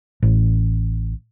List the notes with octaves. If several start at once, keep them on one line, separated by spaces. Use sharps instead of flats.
A1